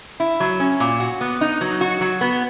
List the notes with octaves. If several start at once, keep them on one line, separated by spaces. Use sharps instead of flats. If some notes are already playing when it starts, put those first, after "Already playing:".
E4
F#3
C#4
A#2
F#4
B3
D#4
F#3
F#4
F#3
B3